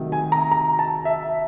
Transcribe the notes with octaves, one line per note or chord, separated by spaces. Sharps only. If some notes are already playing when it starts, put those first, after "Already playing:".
Already playing: C3 D#3 F#3 A3
G#5
A#5
A#5
A5
E5